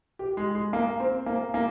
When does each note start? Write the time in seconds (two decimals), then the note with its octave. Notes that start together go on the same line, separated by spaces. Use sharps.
0.19 G4
0.37 G#3
0.55 G#3
0.73 A#3
1.00 C4
1.26 A#3
1.54 A#3